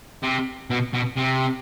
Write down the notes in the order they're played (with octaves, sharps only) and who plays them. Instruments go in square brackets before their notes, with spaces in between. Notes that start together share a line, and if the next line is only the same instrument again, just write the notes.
[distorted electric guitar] C3
B2
B2
C3